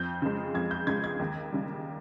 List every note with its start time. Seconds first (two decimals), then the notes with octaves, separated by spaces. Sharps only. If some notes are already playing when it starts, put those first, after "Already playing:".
Already playing: F2 G6
0.22 C#3 G#3
0.54 F2 G#6
0.71 G6
0.87 C#3 G#3 G#6
1.04 G#6
1.19 D#2
1.53 C#3 G3